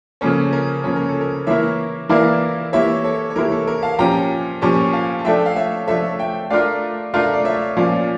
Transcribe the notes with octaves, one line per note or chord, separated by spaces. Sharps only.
C#3 F3 A#3 C#4 A4 C#5
A#4
C#3 F3 A#3 C#4 C#5
A#4
A4
A#4
E3 A#3 E4 A#4 C#5 E5
E3 A#3 E4 A#4 D5 F5
E3 A#3 E4 G4 C#5 E5
A4 C#5
C#5
E3 A#3 E4 G4 A#4
A4
A#4
F5 A5
A#2 F3 C#4 G4 G5 A#5
A#2 F3 C#4 G4 A5 C#6
F5 A5
A5
F3 A3 D4 A4 E5 G5
F5
C#5 E5
F3 A3 D4 A4 C#5 E5
E5 G5
A3 D4 F4 A#4 D5 F5
A3 D4 F4 A#4 F5 A5
D5
C#5 E5
A#2 F3 C#4 D5 F5